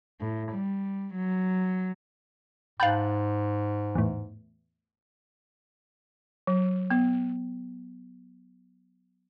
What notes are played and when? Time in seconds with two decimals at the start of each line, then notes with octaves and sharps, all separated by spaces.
0.20 A2
0.51 G3
1.14 F#3
2.80 G#2 F5 G5 A5 B5 F#6
3.95 E2 A2
6.47 F#3
6.91 B3